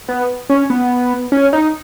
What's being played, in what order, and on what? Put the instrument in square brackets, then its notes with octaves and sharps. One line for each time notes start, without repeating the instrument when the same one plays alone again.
[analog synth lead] B3
C#4
B3
C#4
D#4